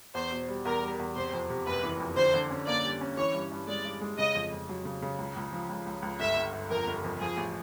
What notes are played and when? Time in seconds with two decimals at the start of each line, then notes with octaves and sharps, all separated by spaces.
0.15 E2 C5
0.32 B2
0.48 G3
0.65 E2 A#4
0.83 G3
0.99 E2
1.16 C3 C5
1.33 F2
1.50 C3
1.66 F#1 B4
1.83 E3
2.00 F2
2.17 D3 C5
2.34 D3
2.50 C#4
2.67 A#3 D5
2.84 G3
3.01 C#4
3.17 E3 C#5
3.34 G2
3.52 G2
3.68 G#3 D5
3.85 G2
4.01 G#3
4.18 C#3 D#5
4.35 F2
4.52 F2
4.69 F#3
4.85 C#3
5.02 C#3
5.18 C#2
5.36 C#2
5.52 F3
5.69 C#2
5.86 C#2
6.02 C#2
6.20 G1 E5
6.37 G1
6.53 G1
6.70 F2 A#4
6.87 G1
7.04 F2
7.21 F3 G#4
7.37 A1